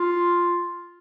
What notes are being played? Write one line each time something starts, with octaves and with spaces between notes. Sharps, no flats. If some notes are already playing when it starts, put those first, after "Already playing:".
Already playing: F4